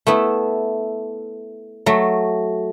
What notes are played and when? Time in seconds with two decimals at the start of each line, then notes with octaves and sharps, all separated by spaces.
0.07 A3 B3 E4
1.86 F#3 A3